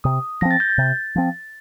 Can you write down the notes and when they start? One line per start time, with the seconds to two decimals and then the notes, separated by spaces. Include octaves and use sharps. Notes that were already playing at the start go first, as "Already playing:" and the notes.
0.04 C3 D#6
0.41 F3 C4 A#6
0.51 A6
0.60 G6
0.70 A6
0.78 C3
1.16 F3 C4